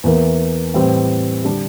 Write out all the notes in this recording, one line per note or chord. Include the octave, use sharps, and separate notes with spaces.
E2 E3 A#3
A2 E3 G3 C4
D3 G3 D4 G4